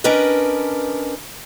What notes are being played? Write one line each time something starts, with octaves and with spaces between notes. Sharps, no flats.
C#4 D4 A#4 B4 D#5